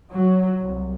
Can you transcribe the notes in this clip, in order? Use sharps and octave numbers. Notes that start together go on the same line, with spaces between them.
F#3
C2